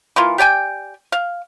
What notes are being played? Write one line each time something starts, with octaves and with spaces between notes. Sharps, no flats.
E3 A#3 F4
G4 D5 G5 G#5
F5